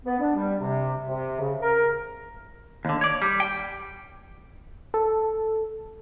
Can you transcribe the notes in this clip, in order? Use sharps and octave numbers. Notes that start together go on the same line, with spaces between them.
B3
D4
G3
C3
C3
C#3
A#4
D#2 D3
C#5 D5
G3
G5
A4